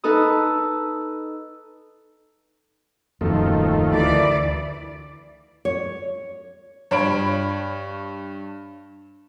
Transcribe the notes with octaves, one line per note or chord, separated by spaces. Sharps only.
D#4 A4 B4 D#6
D#1 F#2 D#3 F3 A3
D2 E3 D5
C#5
G2 C#5 B5 D7